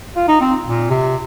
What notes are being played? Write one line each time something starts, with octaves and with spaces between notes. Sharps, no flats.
F4
D#4
C4
A#2
C3